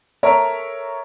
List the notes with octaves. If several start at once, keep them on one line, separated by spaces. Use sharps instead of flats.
A4 A#4 C#5 E5 A#5